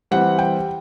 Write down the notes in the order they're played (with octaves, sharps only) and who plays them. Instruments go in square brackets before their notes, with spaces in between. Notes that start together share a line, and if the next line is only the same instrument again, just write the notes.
[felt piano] E3 G3 C4 F#5
G5